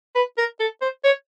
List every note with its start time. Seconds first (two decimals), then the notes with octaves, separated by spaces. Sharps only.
0.15 B4
0.38 A#4
0.60 A4
0.81 C5
1.04 C#5